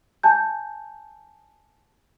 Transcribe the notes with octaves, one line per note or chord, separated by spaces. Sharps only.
G#5 A5 G6